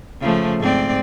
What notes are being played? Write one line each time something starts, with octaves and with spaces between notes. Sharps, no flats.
C#3 F3 A3
G#2 C4 D5